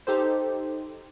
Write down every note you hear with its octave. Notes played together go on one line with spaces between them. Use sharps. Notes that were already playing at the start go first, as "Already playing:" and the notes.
D#4 G4 A4 C5